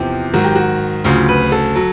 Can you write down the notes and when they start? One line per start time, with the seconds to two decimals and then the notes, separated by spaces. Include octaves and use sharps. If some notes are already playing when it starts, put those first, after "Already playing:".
Already playing: E2 C3 F3 G4
0.34 G#2 D#3 F#3 F#4
0.45 G4
0.56 F#4
1.04 D2 C#3 F#3 F4
1.29 B4
1.52 A4
1.76 F#3